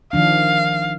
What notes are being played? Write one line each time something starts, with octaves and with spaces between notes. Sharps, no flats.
D#3 F3 D4 F5